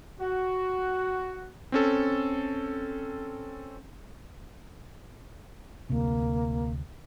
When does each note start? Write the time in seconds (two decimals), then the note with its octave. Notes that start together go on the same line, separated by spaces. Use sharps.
0.20 F#4
1.72 C4 C#4 A4
5.90 D2 C3 A#3